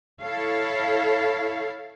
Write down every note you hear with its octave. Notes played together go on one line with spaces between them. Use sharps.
E4 A4 C#5 F5